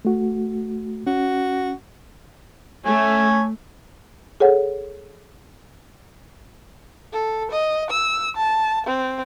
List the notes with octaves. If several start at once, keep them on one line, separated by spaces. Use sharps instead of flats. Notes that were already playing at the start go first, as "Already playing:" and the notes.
A3 F#4
C#4 F#4
A3 C#5 G#5
G#4 A4 C#5 F#5
A4
D#5
E6
A5
C4